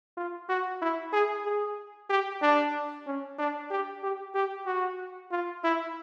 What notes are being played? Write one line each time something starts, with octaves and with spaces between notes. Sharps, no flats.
F4
F#4
E4
G#4
G#4
G4
D4
C#4
D4
G4
G4
G4
F#4
F4
E4